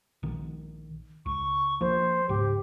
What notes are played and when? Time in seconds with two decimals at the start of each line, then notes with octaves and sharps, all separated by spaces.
0.23 A#1 D#3
1.26 C#2 C#6
1.81 F3 A#3 C5
2.29 C#2 G#2 G4